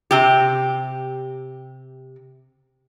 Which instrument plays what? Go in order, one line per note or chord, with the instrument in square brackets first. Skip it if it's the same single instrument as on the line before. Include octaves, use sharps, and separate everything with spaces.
[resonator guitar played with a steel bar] C3 G4